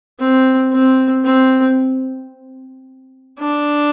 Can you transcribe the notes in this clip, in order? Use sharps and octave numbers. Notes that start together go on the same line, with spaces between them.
C4
C4
C4
D4